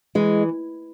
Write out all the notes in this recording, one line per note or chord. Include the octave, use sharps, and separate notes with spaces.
E3 G#3